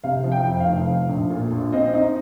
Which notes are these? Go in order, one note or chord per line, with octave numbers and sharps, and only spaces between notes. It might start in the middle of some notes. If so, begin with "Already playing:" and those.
C3 F5
F3
G5
F2
F5
F1
F3
A#1
A#2
A#1
C4 D#5
D#4